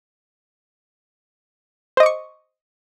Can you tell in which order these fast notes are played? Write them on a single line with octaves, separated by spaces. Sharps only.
C5 D#5 D6 C#6